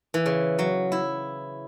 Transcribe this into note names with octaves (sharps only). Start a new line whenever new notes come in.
E3
C#3
F#3
E4